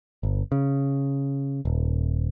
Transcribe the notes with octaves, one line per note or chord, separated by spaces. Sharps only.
G1
C#3
D#1